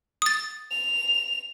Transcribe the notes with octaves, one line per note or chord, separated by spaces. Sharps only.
D#6 A6
F7